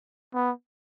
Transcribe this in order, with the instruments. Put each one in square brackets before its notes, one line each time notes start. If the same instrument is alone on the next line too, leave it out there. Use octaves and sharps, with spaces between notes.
[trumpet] B3